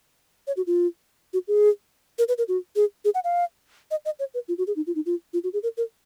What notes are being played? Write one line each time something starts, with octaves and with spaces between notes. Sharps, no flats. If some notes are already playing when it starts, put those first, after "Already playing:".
C#5
F#4
F4
F#4
G#4
A#4
B4
A#4
F#4
G#4
G#4
F#5
F5
D#5
D#5
C#5
B4
F4
F#4
G#4
D#4
F4
D#4
F4
F4
F#4
G#4
A#4
A#4